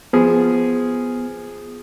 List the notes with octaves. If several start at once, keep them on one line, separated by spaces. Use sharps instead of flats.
F3 B3 G#4